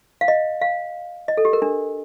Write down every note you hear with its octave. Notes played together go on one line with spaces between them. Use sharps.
F5
D#5
F5
D#5
A4
G4
A#4
D4